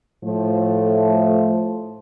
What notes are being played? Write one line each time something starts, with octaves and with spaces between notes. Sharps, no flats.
A2 F3 A3